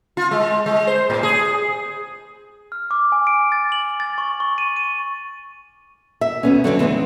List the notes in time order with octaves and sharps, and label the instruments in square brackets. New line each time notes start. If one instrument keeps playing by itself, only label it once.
[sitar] F4
G#3
G#3
C5
A2
G#4
[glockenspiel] F6
D6
G#5
D7
A6
F#7
A6
C#6
C#6
D#7
D#7
[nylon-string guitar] E5
D2 B3 C#4
D3 F#3 G3 C4
E3 G#3 B3 C4